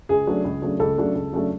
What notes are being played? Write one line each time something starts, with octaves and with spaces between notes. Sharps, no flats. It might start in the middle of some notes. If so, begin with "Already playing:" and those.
C#2 G#4
C#3 F#3 A3 D4
C#2
C#3 F#3 A3 D4
C#2 A4
C#3 F#3 A3 D4
C#2
C#3 F#3 A3 D4